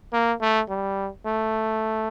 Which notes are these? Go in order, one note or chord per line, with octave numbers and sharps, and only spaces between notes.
A#3
A3
G3
A3